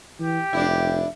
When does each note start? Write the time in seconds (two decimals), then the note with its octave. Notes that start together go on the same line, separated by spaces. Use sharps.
0.20 E3 G4
0.53 F1 D4 E4